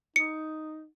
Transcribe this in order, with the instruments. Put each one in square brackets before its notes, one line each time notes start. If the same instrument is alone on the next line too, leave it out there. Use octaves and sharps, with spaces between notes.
[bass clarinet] D#4 [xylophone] C#7